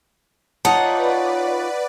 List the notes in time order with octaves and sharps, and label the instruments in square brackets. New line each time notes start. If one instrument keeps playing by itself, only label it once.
[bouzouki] D#4 F4 C#5 [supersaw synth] B4 D5 [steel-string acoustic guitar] F#5 [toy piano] A5